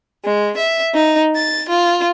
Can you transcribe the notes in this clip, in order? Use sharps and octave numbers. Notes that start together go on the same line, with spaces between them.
G#3
E5
D#4
A6
F4